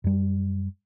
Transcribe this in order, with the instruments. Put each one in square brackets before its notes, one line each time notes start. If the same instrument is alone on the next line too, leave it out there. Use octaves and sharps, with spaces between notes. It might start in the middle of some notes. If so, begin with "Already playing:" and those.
[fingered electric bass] F#2 G3